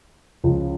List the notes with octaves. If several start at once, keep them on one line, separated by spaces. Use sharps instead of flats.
C#2 C#3 F3